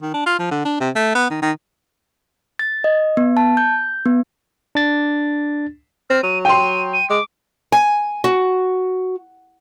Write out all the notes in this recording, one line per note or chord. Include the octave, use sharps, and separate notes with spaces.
D#3
D4
F4
F3
D3
D4
C3
A3
B3
D#3
D#3
A6
D#5
B3
A5
G6
B3
D4 A6
C4 F6
F#3 D#7
G5 C6 D#7
D#7
G#3 D6
G#5
F#4